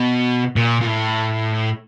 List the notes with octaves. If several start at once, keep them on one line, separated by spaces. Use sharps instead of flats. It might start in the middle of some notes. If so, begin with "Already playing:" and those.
Already playing: B2
A#2
A#2
A2